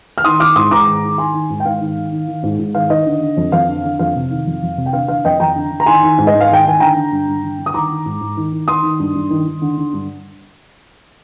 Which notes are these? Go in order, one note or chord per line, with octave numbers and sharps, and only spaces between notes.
F6
D#3 C6 D#6
D#3 D6 F6
G#2 C6 D#6
G#2 A#5 D6
D#3
D#3
D#3 G#5 C6
D#3
G#2
G5
G#2 F5
D#3
D#3
D#3
D#3
G#2
G#2
D#3 F5
D#3 D#5
D3
D3
F2
F2 F5
D3
D3
F2 F5
C3
D#3
F2
F2
C3
G5
D3 F5
D3 F5
F2 D#5 G5
F2 G5 A#5
D3
D3
A#5
D#3 G#5 C6
D#3
G#2
D#5
G#2
F5
D#3 G5
D#3 G#5
D3 G5 A#5
D3
G2
G2
D3
D3
D#6
D#3 A#5 D6
D#3
G#2
G#2
D#3
D#3
D#3 C6 D#6
D#3
G2
G2
D#3
D#3
D3
D3
G2